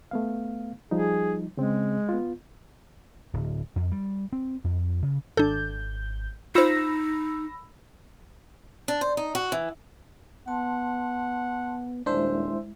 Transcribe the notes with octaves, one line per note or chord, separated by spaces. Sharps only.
A3 B3 F5
F3 G3 D#4 G#4
C#3 G#3 C4
B3 F4
D1
F2
G3
C4
F2
C#3
G#1 D4 A4 G6
D#4 F4 C5 B5 E6 A#6
D4
C5
D#4
F#4
E3
B3 F#5 A5 C6
D#1 G#3 D4 E4 C5 E5